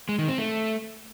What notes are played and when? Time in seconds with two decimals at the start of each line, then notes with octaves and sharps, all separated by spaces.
0.09 G#3
0.19 D#3
0.28 C4
0.38 A3